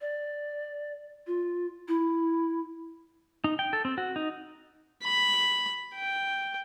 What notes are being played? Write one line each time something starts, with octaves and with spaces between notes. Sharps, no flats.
D5
F4
E4
D#4
G5
A4
C4
F#4
D#4
B5
G5